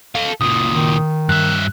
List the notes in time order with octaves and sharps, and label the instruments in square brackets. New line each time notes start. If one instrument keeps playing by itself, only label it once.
[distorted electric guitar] A4 F5
[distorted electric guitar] C#2 A#2 [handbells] D#6
[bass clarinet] D#3
[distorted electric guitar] G2 E5 [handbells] F#6